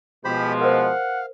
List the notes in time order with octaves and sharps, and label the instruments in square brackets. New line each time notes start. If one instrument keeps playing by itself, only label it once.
[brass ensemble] B2 F3 G#3 [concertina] G4 C5 B5
[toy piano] A#4 C5 [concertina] F5 [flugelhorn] F#5